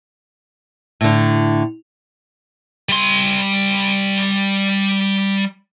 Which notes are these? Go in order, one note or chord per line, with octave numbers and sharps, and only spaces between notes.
A2 D3
G3 C6